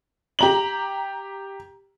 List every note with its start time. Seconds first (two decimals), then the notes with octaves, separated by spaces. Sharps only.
0.39 G4 A#5 F#7